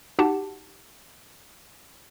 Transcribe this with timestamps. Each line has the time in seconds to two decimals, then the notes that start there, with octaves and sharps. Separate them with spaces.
0.19 D#4 F#4 G4 F#5 A5